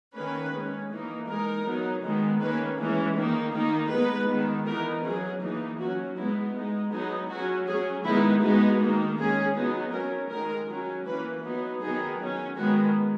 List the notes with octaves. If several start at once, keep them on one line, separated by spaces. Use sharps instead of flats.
D#3 A#3 C#4 B4
G#3 C#4
E3 A#3 D#4
G#3 D#4 A#4
F#3 B3 D#4
D#3 G#3 B3
D#3 A#3 C#4 B4
E3 G#3 C#4
D#3 A#3 D#4
D#3 A#3 D#4
G#3 B3 D#4 B4
D#3 G#3 B3
E3 B3 D#4 A#4
F#3 C#4 G#4
E3 A#3 D#4
F#3 C#4 F#4
G#3 B3 D#4 E4
G#3 D#4
F#3 B3 D#4 G#4
F#3 C#4 F#4
F#3 C#4 G#4
D#3 G#3 B3 D#4 E4
G#3 B3 D#4 F#4
D#3 A#3 D#4
G#3 C#4 G#4
F#3 B3 D#4
F#3 C#4 A#4
D#3 G#3 D#4 A#4
F#3 C#4
E3 A#3 C#4 B4
F#3 B3 D#4
D#3 F#3 B3 D#4 G#4
F#3 C#4
D#3 G#3 B3 F#4